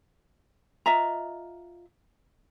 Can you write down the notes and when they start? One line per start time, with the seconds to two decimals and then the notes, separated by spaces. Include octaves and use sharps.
0.86 F4 D#5 E5 A#5